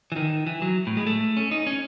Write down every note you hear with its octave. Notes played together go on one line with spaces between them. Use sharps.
E3
D#3
E3
F#3
A2
G#3
A3
C#4
D#4
C#4